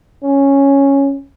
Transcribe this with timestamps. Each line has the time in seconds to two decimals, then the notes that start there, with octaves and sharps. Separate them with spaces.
0.23 C#4